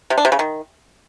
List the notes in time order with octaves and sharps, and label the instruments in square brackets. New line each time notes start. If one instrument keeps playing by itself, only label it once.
[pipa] C3
D4
C3
C#3
D#3